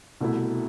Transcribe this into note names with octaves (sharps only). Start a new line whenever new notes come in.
C2 B2 A3 E4